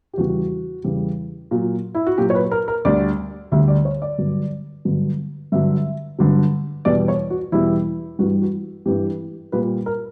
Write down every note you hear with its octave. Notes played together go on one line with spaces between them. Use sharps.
G4
E2 C#3 G3 F#4
E2 C#3 G3
A#2 F#3
E4
F#4
A#2 F#3 G4
C#5
B4
A#4
A#4
D2 D3 G3 D5
D2 D3 G3 E5
D5
C#5
D5
G2 D3 F#3
G2 D3 F#3
G2 D3 F#3 E5
G2 D3 F#3
E2 B2 G3 D5
C#5
F#4
E2 B2 G3 E4
G2 E3 G3 F#4
F#4
G2 E3 G3 G4
A#2 G3 B4
A#4